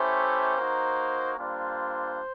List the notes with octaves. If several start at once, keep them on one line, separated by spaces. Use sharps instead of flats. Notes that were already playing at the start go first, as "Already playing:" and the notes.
Already playing: A3 C#4 E4 G4 C5
A#3 D#4 F#4
G3 A#3 D4 F4 C5